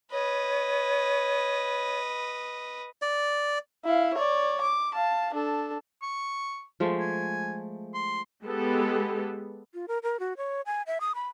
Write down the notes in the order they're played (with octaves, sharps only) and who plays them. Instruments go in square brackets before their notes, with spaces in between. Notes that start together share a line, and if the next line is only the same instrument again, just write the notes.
[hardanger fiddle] B4 D#5 [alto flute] C#5
[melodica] D5
[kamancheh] E4 F5
C#5 D5
D6
F5 A5
D4 A4
[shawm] C#6
[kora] F3 G#3 A3
[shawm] G#5
C6
[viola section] G#3 B3 G4 A4
[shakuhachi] F4
A#4
A#4
F#4
C#5
G#5
E5
D#6
B5